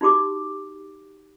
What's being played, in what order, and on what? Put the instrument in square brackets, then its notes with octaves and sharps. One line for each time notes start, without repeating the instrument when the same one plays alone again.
[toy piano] D#4 F#4 G4 D6